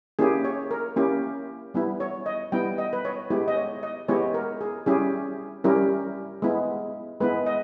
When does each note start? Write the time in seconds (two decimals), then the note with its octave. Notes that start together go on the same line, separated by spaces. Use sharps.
0.19 A#3 C#4 E4 G4 G#4
0.45 C#5
0.71 A#4
0.96 A#3 C#4 E4 G4
1.74 G3 B3 E4
2.00 C#5
2.26 D#5
2.52 G3 B3 E4 G5
2.78 D#5
2.93 B4
3.05 C#5
3.30 G#3 B3 E4 G4
3.48 D#5
3.56 C#5
3.83 D#5
4.08 G#3 B3 E4 G4 C#5
4.34 A#4
4.61 G#4
4.86 G3 C#4 E4 G4 G#4
5.64 G3 C#4 E4 G4 A#4
6.42 G#3 B3 E4
7.20 G#3 B3 E4 B4
7.46 D#5